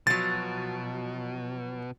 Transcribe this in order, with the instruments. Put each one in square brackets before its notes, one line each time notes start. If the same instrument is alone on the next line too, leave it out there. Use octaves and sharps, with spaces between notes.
[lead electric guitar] B2 [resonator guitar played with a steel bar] F3 F#3 [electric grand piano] A6